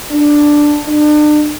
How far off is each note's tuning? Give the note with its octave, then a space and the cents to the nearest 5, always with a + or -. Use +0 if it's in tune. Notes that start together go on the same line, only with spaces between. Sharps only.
D4 +5
D4 +35